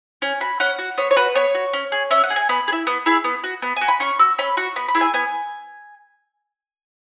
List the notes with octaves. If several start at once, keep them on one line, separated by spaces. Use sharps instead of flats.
C#4 G#5
F#4 B5
C#4 F#5
F#4
B3 C#5
C#5
F#4 B4
B3 C#5
F#4
C#4
G#4
C#4 E5
F#5
G#4
G#5
B3 B5
G#4
E4
B3
E4 G#4
B3
F#4
B3
F#4 G#5
B5
C#4 C#6
F#4 E6
C#4 B5
F#4 C#6
B3 B5
B5
E4 G#4
G#5
B3 G#5